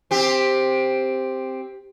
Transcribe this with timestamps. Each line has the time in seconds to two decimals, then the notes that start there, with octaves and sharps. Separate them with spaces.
0.11 C4 G4